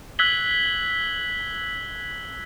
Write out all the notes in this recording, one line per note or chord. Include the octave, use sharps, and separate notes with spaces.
E6 F#6 G#6 B6 F#7 G7